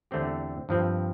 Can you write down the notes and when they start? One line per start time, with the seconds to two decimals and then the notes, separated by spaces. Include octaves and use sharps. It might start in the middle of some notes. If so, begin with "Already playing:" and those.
0.11 E2 D3 A3 C4 G4
0.69 G2 F3 C4